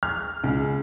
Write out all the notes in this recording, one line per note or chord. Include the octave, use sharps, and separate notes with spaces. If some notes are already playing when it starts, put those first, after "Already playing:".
F6
C#2